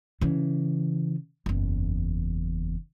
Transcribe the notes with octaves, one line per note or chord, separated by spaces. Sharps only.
C#3 E3
F#1 E2